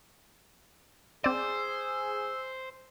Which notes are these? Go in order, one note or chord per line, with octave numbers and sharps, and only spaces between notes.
C4 G#4 C5 D5 E6